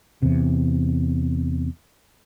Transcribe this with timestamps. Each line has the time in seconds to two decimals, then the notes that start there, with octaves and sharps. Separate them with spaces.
0.22 E2 C3